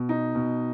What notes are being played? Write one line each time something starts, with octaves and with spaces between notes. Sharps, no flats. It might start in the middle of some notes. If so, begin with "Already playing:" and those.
Already playing: B2
D#4
B2